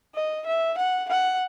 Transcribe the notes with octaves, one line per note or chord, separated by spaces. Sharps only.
D#5
E5
F#5
F#5